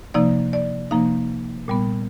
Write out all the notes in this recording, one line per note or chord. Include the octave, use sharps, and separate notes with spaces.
C3 F3 A#3 D#4 D5
D5
C3 F3 A#3 D#4 F5
A#2 G3 B3